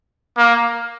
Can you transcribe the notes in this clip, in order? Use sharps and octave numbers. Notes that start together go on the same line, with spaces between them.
A#3